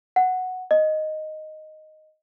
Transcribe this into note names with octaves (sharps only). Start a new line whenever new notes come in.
F#5
D#5